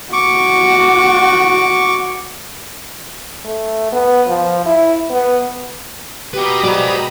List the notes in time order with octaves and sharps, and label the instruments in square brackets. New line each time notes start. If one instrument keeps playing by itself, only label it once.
[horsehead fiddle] F#4 [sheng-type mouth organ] C#6 D6
[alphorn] A3
B3
F3
E4
B3
[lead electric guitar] F#4 B4 [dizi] G4 [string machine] A#5 B5 D#6
[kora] B2 G#3 [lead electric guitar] C5 D5